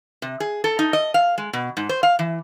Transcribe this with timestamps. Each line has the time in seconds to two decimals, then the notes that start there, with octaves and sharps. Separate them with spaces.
0.22 C3
0.40 G#4
0.64 A4
0.79 D#4
0.93 D#5
1.14 F5
1.38 G#3
1.53 B2
1.77 G#2
1.89 C5
2.03 F5
2.19 E3